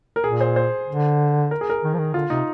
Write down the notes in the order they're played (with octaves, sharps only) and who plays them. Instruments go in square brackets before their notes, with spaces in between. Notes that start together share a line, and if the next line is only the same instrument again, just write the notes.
[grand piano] A#4
[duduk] A#2 [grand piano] G#4
[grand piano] C5
C5
[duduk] D3
[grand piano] A#4
G#4
A#4
[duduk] D#3
F3
D#3
[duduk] D3 [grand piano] F4
[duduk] C3 [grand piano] D#4